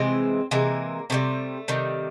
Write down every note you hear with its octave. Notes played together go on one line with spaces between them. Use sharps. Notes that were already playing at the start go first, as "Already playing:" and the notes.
Already playing: C3 E3 G#3 C4
C3 E3 G#3 A#3
C3 D#3 G3 A3
C3 D#3 G3